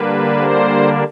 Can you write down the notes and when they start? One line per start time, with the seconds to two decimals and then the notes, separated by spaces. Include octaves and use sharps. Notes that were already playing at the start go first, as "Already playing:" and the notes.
Already playing: D3 G3 A#3 D4 B4
0.40 C5